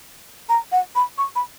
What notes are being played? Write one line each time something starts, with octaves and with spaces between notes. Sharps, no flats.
A#5
F#5
B5
C#6
B5